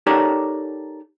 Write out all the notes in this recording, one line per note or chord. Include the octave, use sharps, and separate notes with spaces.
D#4 G4 A4 A#4 C#5 D5